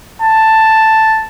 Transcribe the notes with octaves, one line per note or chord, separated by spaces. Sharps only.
A5